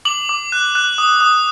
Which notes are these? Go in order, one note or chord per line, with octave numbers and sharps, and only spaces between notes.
D6 F#7
D6
F#6
F#6
D#6
D#6